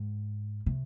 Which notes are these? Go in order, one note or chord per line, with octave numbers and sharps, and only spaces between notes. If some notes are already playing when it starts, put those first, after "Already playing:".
Already playing: G#2
C3